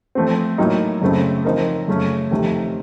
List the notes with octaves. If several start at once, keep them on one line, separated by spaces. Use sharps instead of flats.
F3 A3 C4
A2 F#3 A#3 D#4
F#2 C#3 A3 C4
F3 C4 D#4 A#4
F#2 C#3 A3 C#4
F2 C3 D#3 A3